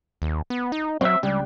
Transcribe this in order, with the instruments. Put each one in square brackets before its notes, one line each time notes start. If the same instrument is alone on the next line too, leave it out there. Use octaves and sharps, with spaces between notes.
[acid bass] D#2
B3
D#4
[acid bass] F#3 [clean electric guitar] C4 E5
[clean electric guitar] C#2 D4 G4 [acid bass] G3